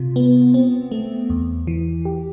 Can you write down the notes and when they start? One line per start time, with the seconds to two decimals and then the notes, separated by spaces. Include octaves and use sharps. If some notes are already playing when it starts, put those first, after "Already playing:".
Already playing: C3 F4
0.16 B3
0.54 C4
0.91 A3
1.30 E2
1.67 E3
2.05 G4